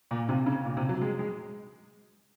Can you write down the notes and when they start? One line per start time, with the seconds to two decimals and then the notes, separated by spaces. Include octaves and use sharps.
0.11 A#2
0.29 C3
0.46 C#3
0.65 A#2
0.77 C3
0.89 F#3
1.01 G#3
1.19 G#3